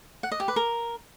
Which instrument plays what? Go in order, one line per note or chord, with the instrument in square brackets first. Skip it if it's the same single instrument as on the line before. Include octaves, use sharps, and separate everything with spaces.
[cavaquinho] F#5
D#5
G4
B4
A#4